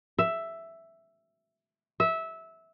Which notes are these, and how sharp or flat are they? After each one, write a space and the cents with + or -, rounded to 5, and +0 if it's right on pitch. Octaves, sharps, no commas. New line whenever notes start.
E5 +5
E5 -15